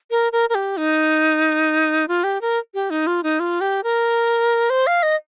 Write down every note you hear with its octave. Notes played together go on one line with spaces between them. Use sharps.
A#4
A#4
A#4
G4
D#4
F4
G4
A#4
G4
D#4
F4
D#4
F4
G4
A#4
C5
F5
D#5